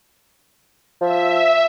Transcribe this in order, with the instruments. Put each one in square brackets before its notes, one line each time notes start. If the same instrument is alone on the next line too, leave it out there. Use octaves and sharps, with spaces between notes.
[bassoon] F3 [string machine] E5